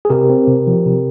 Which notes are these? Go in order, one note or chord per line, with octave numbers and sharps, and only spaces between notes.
G#4
C3 G4 A#4
C4
C3
F3
C3